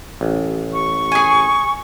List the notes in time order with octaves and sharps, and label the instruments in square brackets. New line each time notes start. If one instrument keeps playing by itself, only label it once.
[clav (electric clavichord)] A1
[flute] C#6
[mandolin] G#4 G#5